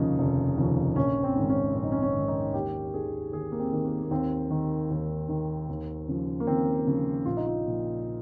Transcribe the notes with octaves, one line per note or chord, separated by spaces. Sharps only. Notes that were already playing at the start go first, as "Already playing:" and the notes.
Already playing: F1 D#2 C#3 F3 D#4
F1
D#2 C#3 F3
A#1 C#4
C4
G#2 D#3
C#4
A#1 C#4
D#4
C#4
C#4
G#2 D#3
D#4
D#2 G4
D#3 G#4
D#2 G#4
A#3
C4
D#3
A#3
A#3
D#2 C4
D#3
D#2
D#3
D#2
C#3 F3
A#3
D#2 C4
C#3 F3
A#1 F4
D#4
F4
A#2 F3